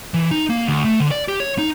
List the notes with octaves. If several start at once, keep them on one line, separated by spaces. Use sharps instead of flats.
E3
D#4
A#3
D2
A3
D3
D5
G4
C#5
D#4